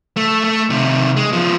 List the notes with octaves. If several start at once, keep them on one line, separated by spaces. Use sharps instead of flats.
A3
A3
C3 D#3
G#3
F3 B3